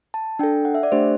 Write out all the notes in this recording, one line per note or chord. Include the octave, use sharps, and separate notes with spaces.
A5
D4 A4 G5
F#5
E5
D5
A3 D4 G4 C5